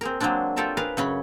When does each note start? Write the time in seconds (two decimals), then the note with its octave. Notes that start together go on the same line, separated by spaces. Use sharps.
0.01 C4 G#4 A#4
0.20 F#3 G#3 A#3 C4 D4
0.56 F4 G4 A4 A#4 D5 E5
0.77 G#4 A#4 B4 F5
0.97 F#2 C#3 C#4 B5